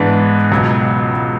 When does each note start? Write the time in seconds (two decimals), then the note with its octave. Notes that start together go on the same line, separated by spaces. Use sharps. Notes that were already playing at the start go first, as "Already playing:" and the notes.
Already playing: G#2 E3 B3 D4
0.51 C#2 B2 F#3